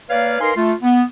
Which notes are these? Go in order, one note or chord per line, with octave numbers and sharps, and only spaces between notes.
A#3 B4 C#5 D5 F5
D#4 A#4 B4 F5 G#5 C6
A3 F4
B3